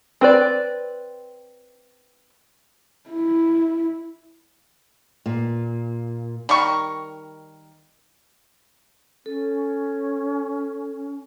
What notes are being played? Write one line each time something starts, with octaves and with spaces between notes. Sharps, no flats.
C4 B4 D5
E4
A#2
D#3 G3 A#4 C#6
C#4 A4